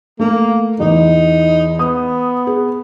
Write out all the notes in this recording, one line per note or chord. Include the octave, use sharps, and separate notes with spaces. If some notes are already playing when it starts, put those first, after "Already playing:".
A3 A#3
E2 D#4
B3 D#6
G#4